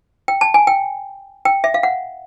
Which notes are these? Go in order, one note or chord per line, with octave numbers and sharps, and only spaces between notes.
G5
A5
G#5
G5
G5
E5
F5
F#5